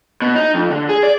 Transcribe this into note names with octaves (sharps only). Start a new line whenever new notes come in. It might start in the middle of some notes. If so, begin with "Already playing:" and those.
B2
D#4
F2
D3
G#4
D5